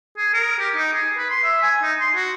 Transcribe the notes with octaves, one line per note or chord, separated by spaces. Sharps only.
G#4
A#4
G4
D#4
G#4
B4
C6
E5
G#5
D#4
C6
F#4